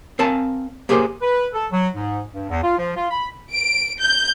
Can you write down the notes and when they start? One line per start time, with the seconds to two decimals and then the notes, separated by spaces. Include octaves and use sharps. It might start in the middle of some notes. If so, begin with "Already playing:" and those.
0.19 C4 A#4 F5 G#5 A5
0.89 A#3 G4 G#4 A#4 C5
1.22 B4
1.54 A4
1.72 F#3
1.95 G#2
2.34 G2
2.50 E2
2.63 F4
2.78 F3
2.97 F4
3.11 B5
3.52 D7
4.00 G6